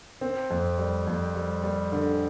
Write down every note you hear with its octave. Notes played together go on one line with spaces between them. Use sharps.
C4
F2
G3
F2
G3
G3
D3